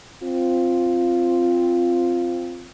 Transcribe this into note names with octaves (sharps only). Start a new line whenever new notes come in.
C4 F4